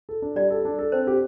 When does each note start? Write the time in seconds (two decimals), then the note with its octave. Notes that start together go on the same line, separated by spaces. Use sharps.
0.09 A4
0.22 D4
0.36 G3 D5
0.50 A4
0.65 D4
0.79 A4
0.92 C4 C5
1.07 G4